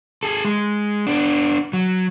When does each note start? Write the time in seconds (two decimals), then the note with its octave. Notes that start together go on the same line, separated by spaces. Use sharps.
0.23 G#4 A4
0.45 G#3
1.07 B3 D4
1.73 F#3